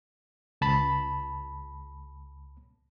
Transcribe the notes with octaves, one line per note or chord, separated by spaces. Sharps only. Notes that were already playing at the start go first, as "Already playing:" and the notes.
C#2 A5 B5